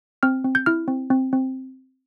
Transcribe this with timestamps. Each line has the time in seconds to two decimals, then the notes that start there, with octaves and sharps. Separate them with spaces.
0.23 C4 F6
0.45 C4
0.55 G6
0.66 E4 F6
0.88 C4
1.10 C4
1.33 C4